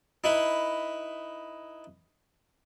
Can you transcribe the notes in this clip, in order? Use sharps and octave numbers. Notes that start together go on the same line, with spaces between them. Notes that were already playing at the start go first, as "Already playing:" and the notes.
D#4 E4 B4